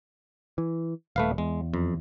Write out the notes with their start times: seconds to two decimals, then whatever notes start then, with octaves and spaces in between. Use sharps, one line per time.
0.58 E3
1.16 D#1 A3 B4 F5
1.38 E2 G#3
1.74 F2